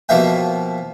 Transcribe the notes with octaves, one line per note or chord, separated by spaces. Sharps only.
B2 F3 A#3 E4 E5 G5